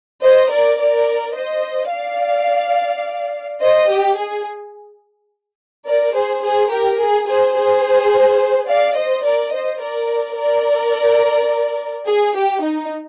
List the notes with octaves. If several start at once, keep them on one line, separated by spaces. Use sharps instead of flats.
C5 D#5
A#4 D5
A#4 D5
C5 D#5
D5 F5
C5 D#5
G4
G#4
A#4 D5
G#4 C5
G#4 C5
G4 A#4
G#4
G#4 C5
G#4 C5
D5 F5
C5 D#5
A#4 D5
C5 D#5
A#4 D5
A#4 D5
G#4
G4
D#4